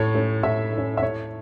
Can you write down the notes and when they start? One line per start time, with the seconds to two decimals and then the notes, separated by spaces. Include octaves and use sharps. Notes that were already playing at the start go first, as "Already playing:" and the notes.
Already playing: A2 C#5
0.15 A3 C#4
0.43 A2 E5
0.73 A3
0.78 C#4
0.97 E5
1.02 A2 C#5